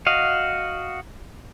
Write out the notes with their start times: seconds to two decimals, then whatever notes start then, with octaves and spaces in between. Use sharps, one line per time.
0.06 F#4 D#5 F5